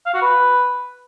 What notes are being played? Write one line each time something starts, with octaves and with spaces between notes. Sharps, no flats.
F5
F#4
B4